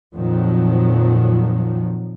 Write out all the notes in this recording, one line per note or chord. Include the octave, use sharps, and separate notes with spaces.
F2 A#2 D#3 F3 F#3